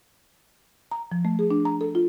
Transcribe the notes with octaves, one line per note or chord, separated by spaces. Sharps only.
A#5
F3
A3
G#4
D4
A#5
A4
F4